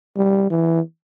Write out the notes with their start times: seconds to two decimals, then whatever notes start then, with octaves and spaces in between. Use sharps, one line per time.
0.16 G3
0.50 E3